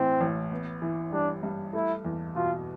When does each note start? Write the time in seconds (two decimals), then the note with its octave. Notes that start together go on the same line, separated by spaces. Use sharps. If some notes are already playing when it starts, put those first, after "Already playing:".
Already playing: A2 E3 C4
0.21 A1
0.52 B3
0.82 E3
1.12 G3 D4
1.43 G2
1.73 A3 E4
2.05 E2
2.35 B2 F4